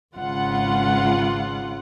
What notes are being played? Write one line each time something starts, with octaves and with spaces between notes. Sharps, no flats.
G#1 C#2 F4 F#5